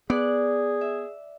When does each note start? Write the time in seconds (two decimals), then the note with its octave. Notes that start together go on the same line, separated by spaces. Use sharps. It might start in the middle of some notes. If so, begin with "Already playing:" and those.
0.10 B3 G#4 D5 F#6
0.81 E5